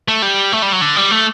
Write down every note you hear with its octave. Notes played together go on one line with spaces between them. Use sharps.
A3
G3
A3
G3
F#3
D3
G3
A3